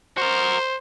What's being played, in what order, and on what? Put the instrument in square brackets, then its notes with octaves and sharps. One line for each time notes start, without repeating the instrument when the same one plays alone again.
[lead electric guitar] F#4 A#4 [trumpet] C5